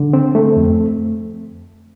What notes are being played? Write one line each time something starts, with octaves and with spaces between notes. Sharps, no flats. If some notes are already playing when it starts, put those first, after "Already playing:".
Already playing: D3
C4
A3
F2